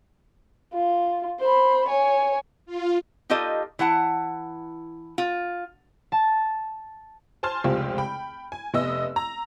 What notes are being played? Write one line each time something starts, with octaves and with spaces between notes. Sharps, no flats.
F4
C5 B5
C#5 G#5
F4
D#4 F4 G4 A4 D#5
E3 E4 F#5 A5
F4
A5
C5 G#5 A5 C6 F6
F1 C#2 C4 F4 G4
G5 B5
G#5
F1 B3 D#5 E5 E6
A#5